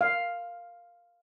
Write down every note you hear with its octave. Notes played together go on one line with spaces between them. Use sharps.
F5